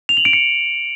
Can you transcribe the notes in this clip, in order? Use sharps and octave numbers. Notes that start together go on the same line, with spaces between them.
F7
F#7
D7
C#7